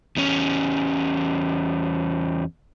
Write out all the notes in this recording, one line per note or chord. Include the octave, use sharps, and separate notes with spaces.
E2 C#4